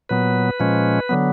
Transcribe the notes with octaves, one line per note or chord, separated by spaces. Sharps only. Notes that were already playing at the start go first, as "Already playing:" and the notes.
A#2 F#3 B3 B4
A#2 F3 G#3 C#4
D3 F#3 B3